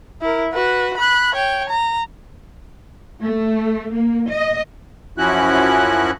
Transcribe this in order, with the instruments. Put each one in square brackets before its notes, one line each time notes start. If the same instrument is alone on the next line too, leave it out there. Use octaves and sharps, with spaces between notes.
[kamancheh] E4 A#4
F#4 B4
B5 F#6
C#5 G5
A#5
[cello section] A3
A#3
D#5
[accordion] F#2 F3 C#4 E4 F#4 F#6